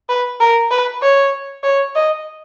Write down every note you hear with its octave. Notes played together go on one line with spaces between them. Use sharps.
B4
A#4
B4
C#5
C#5
D#5